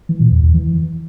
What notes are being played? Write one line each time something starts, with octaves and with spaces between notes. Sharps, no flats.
E3
A#2
E2
E2
E3